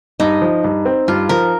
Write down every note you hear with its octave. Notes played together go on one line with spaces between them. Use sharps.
G2 D#4
F3
G2
C4
G2 F4
F3 A#4